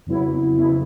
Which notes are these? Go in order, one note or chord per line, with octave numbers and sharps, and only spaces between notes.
F2 C#3 F#3 B3 E4
F2 C#3 F#3 B3 E4